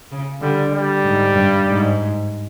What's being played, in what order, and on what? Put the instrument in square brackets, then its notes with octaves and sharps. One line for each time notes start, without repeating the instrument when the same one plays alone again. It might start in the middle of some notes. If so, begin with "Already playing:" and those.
[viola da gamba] C#3
[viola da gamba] D3 [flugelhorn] G3
[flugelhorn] G3
[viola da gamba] G#2
G2
G#2